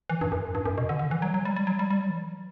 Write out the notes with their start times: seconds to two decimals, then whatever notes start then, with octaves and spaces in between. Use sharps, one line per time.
0.10 E3
0.21 G2
0.32 F#2
0.55 G2
0.66 F#2
0.78 B2
0.89 D3
0.99 D3
1.11 E3
1.22 F#3
1.34 F#3
1.45 G3
1.56 G3
1.67 F#3
1.79 G3
1.90 G3
1.99 F#3
2.10 E3
2.19 F#3